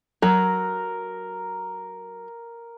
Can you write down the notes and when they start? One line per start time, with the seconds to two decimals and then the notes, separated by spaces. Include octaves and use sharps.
0.22 F#3 A#4